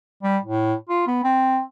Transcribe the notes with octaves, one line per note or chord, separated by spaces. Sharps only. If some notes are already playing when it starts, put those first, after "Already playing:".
G3
A2
F4
B3
C4